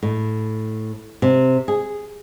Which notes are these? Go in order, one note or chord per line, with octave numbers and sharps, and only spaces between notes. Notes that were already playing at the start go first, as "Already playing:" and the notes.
A2
C3
G#4